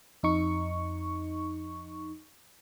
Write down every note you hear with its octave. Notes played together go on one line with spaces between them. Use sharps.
F2 D#4 C#6